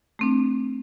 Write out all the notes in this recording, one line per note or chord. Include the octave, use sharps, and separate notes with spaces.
A3 C4 D4